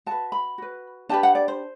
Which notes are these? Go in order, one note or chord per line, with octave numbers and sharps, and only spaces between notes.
F#4 B4 A5
B5
F#4 B4
D4 G4 B4 A5
F#5
D5
C5